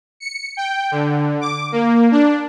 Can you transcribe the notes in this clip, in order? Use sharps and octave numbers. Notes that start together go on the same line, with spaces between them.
C#7
G5
D3
D6
A#3
D4